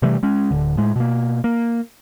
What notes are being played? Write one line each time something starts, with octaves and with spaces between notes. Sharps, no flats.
C3 E3 G3 A3
G#3 C#4
D1 D3
A2 G#3
B2 A#3
A#3